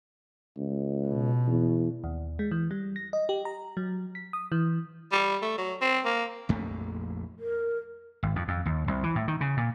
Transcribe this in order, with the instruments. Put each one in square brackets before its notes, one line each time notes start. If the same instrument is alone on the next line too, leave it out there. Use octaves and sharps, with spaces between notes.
[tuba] C#2
[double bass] B2
[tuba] E2
[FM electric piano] D#2
G#3
E3
G3
A#6
D#5
G4
A#5
F#3
B6
D#6
E3
[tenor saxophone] G3
A3
F#3
C4
A#3
[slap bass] A#1 F2 A3
[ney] A#4
[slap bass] G#1
F2
F2
D#2
C2
E3
A2
D#3
C#3
A#2